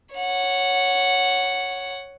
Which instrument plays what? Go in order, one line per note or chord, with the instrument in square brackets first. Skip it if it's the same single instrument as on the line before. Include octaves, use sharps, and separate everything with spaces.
[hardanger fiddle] C#5 F#5